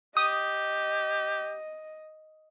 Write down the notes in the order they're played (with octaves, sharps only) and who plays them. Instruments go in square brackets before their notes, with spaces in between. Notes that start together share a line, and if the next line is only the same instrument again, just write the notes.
[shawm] G4 [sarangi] D#5 [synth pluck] D#6